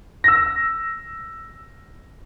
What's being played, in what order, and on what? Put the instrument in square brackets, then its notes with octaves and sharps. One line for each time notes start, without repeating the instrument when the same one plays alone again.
[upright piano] E6 A#6